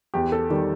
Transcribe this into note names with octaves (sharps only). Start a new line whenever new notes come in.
E2 G4
A4
D#3 G3